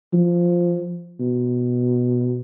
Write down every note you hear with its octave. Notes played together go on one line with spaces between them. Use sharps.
F3
B2